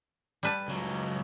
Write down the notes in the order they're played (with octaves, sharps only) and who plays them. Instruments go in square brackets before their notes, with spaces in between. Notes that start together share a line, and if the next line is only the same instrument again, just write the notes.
[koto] G3 B4 A5
[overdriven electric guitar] C#2 F#3